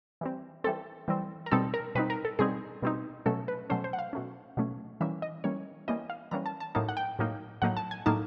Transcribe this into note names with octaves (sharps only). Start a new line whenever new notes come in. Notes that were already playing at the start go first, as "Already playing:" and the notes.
E3 G3 C4
E3 G3 C4 A4
E3 G3 C4
A#4
B2 G3 C4 D#4 A4
A#4
B2 G3 C4 D#4 B4
A#4
A4
B2 G3 C4 D#4 G#4
B2 G3 C4 D#4
B2 F#3 A3 C#4 A4
B4
B2 F#3 A3 C#4 C5
C5
F#5
F5
B2 F#3 A3 C#4
B2 F#3 A3 C#4
E3 G3 A#3 C#4 E5
D#5
E3 G3 A#3 C#4 C#5
E3 G3 A#3 C#4 D#5
F5
E3 G3 A#3 C#4 A#5
A5
A5
A2 F#3 A#3 D#4 A5
F#5
G5
A2 F#3 A#3 D#4
A2 F#3 A#3 D#4 F#5
A5
G#5
A2 F#3 A#3 D#4 A5